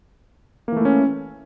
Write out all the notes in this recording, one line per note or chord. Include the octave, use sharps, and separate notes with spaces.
E3 A3 A#3 C#4 E4